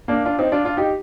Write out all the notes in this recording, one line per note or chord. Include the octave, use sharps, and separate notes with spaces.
A#3 D4
D4 F4
C4 D#4
D4 F4
D4 F4
D#4 G4